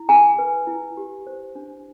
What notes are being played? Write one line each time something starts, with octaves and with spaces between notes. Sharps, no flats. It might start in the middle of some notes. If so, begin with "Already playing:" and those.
Already playing: E4
G#4 G#5 A#5
B4
E4
G4
C5
D4